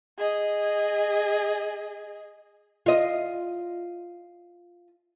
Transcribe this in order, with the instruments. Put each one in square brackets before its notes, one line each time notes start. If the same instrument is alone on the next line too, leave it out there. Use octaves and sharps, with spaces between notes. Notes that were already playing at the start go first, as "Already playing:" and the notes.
[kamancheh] G#4 D#5
[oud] F4 D#5